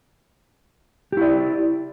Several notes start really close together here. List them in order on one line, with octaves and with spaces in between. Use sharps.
G4 E4 D5